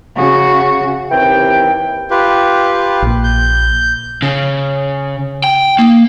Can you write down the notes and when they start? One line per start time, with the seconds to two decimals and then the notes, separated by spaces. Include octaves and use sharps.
0.16 C#3 F#4
1.11 D#2 C3 E3 G5
2.11 F4 G4 B4
3.02 A#1 A#2
3.24 G6
4.22 C#3
5.44 G5
5.79 A#3